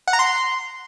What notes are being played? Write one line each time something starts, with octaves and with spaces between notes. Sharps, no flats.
F#5
A#5
C6